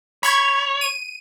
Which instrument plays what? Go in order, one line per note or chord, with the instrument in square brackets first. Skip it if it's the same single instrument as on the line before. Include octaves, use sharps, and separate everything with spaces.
[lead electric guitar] C#5 [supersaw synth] B5 C#6 G#6
[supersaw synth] D#7